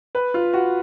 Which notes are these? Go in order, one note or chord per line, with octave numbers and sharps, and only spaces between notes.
B4
F4
F#4